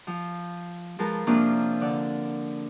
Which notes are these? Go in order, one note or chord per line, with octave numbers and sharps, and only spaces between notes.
F3
F3 G#3 A#4 B4 A5
C3 F3 A#3 C#4 D4 F4
D3 D5